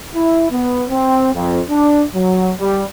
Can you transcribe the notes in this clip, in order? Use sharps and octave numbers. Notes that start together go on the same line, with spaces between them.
E4
B3
C4
F2
D4
F#3
G3